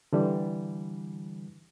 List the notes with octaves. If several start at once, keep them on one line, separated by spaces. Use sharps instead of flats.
D3 E3 G3